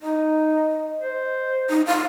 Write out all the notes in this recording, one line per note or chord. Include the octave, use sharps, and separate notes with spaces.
D#4 D#5
C5
D#4
F5